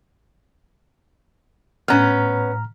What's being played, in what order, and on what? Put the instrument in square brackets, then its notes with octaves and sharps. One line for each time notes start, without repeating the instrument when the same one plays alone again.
[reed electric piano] A2 A#5 F6 [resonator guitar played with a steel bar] B3 C#4